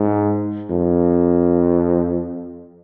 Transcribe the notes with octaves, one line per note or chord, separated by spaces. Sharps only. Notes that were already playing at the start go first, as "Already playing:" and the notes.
Already playing: G#2
F2